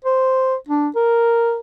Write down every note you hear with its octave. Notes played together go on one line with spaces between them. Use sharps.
C5
D4
A#4